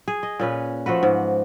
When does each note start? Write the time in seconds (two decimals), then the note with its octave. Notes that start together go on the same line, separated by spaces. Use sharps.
0.08 G#4
0.23 D#5
0.40 A#2 C#4 B4
0.86 F3 A3 F#4 B4
1.03 G#2